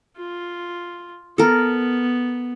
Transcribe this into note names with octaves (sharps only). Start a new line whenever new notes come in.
F4
B3 A4 A#4